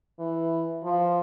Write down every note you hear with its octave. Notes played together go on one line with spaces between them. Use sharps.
E3
F3